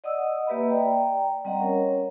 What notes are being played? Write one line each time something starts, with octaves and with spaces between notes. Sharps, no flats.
D5 D#5 F#5 D#6 E6
A#3 G4 B4 D#5 E5 B5
D5 G5 A#5
G3 C4 D#5 F#5 A#5
C#4 A#4 C#5